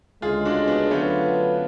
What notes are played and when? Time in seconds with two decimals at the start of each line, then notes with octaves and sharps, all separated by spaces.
0.22 D2 C#3 G#3 F4 G#4
0.45 D4 F#4
0.67 B3 D4
0.91 D3 F#3 A3 B3 C#4 F4 B4